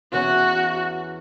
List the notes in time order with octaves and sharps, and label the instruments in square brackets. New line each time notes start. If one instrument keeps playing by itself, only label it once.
[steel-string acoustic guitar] E2 E3 C#4 [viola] F#4